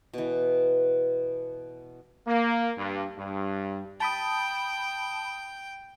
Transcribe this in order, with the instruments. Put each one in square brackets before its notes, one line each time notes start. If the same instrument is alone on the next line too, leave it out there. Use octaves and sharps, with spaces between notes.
[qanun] B2 E3
[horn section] A#3
G2
G2
[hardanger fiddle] G5 [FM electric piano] A5 B5 D#6